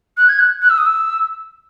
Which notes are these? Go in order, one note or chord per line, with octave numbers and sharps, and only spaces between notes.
F#6
G#6
F#6
F#6
E6
D#6
E6